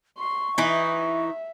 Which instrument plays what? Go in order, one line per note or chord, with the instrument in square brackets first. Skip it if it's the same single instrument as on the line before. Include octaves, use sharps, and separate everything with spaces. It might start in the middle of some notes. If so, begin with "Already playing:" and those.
[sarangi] C6 [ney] C#6
[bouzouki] E3 D#4 [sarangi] E5